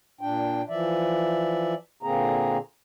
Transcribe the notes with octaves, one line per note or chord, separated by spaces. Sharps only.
A#2 D4 G5
E3 F3 D5 E5
A#2 D3 A#3 C4 G#4 A#5